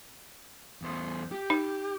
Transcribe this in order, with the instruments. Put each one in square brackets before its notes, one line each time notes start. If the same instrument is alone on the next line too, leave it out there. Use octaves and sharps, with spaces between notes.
[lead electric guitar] E2 C5
G4
[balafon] D#4